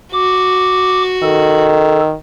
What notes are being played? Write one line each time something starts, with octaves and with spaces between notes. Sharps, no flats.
F#4 D6
D#3 A4